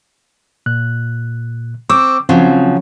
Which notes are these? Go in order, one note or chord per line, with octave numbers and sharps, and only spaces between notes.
A#2 F#6
C4 C#6 D6 E6
C#3 F3 F#3 C4